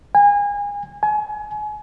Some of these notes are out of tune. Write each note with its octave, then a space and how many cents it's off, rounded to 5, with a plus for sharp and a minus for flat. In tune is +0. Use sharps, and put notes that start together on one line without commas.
G#5 -30
G#5 +30